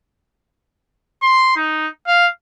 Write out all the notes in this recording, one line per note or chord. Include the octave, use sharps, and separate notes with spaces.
C6
D#4
F5